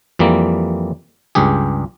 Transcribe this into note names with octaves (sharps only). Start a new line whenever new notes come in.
F2 E3 G3 A#3
C#2 G2 G4 G#4